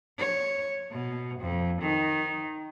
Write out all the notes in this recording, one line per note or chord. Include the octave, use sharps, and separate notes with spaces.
C#5
B2
F2
D#3